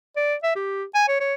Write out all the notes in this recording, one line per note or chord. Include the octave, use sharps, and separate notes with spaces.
D5
E5
G4
G#5
C#5
C#5